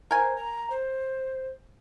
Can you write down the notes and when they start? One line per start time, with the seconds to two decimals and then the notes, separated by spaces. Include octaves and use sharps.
0.11 A#4 C5 G#5
0.36 A#5
0.70 C5